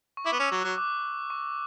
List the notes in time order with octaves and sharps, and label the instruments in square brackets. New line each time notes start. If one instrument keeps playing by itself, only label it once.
[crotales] C#6
[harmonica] E4 [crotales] D6
[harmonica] B3
[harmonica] C#4 [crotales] E6
[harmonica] F#3
[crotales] F#6
[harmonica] F#3
[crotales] D6
C#6